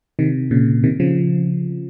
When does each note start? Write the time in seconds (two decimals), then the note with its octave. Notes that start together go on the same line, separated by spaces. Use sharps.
0.19 C3 D#3
0.51 A#2 C#3
0.84 C3 D#3
1.00 C#3 F3